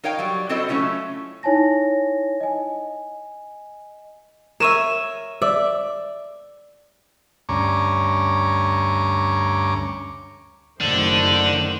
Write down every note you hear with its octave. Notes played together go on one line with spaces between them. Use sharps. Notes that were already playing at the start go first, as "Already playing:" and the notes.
D#4 A#4 C#5 F5 G5 G#5
F#3 G3
C4 E4 F#4 A4 C5 D#5
F#3 A3 C#4 E4 F4
D#4 E4 C#5 G#5 A5 A#6
D#5 G#5
A#4 C#5 E5 D#7 E7
D5 E5
D2 G2 C#4 A#5 C#6 D6
F#1 D3 D#3 A3 D4 C5 F#7